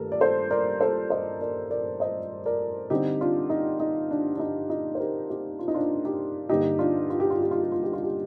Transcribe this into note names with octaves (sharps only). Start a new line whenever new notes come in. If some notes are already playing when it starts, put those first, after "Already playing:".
Already playing: G2 D#3 A3 A4 A#4
D5
A4 C5
A#4 D5
A4 C5
C5 D#5
A#4 D5
A#4 D5
C5 D#5
A#4 D5
D3 G3 C4 D#4 G4
D4 F4
D#4
D#4
D4
D4
D#4
D#4
C5
G4 A#4
D#4 G4
F4
D#4
D4 F4
D#4 G4
G2 D3 G3 A#3 D#4 G4
D4 F4
F4
G4
F4
G4
F4
G4
F4
G4
F4
G4